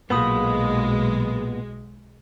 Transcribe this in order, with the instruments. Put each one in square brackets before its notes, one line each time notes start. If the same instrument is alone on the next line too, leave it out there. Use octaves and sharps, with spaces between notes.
[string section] B1 G#3 [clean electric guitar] A#2 B3 [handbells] A#3 B5 D#6